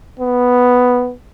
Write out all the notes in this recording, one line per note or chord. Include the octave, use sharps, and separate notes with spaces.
B3